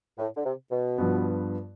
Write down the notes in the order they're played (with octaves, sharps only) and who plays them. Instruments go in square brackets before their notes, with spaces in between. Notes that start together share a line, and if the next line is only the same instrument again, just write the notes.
[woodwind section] A2
D3
C3
B2
[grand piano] G2 F3 B3